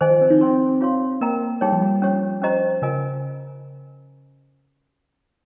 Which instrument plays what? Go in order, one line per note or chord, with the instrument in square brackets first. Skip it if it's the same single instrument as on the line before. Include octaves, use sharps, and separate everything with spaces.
[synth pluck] D#3 [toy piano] G#4 C5 D#5 G#5
[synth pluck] F3
C4
D#4
[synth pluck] C4 [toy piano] C5 G5 C6
[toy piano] F4 G#4 C#5 F5 C6
[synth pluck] A#3 [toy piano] A#4 D#5 G5 A#5
[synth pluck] G3 [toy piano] D#4 G#4 C#5 G5
[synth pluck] F3
G3
[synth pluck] F3 [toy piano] C#4 G4 C#5
[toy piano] C#4 G4 C5 D#5 A#5
[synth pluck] C#3 [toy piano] C#4 F4 A#4 D#5 G#5